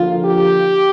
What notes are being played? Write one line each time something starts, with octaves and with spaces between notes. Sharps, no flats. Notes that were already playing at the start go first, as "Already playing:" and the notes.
Already playing: D3 F3 A#3 F4
G4